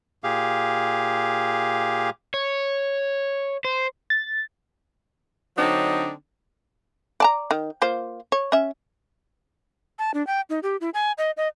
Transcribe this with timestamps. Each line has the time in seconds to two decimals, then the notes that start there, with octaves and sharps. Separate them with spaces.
0.24 A#2 G4 G#4 F5
2.34 C#5
3.65 C5
4.10 A6
5.57 D3 F#3 C4 D4 D#4
7.20 D5 A5 A#5
7.51 D#3
7.82 A#3 F4 C5
8.32 C#5
8.52 C#4 E5
9.99 A5
10.14 D4
10.27 G5
10.50 D#4
10.63 G4
10.81 E4
10.94 G#5
11.18 D#5
11.37 D#5